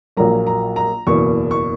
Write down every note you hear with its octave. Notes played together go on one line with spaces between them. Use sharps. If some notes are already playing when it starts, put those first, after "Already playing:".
A#1 A#2 F#3 A#3 A#5
A#5
A#5
F#1 E2 B2 A#3 C#6
C#6